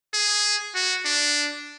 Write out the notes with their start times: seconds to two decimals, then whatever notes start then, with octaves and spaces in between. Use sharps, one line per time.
0.14 G#4
0.75 F#4
1.05 D4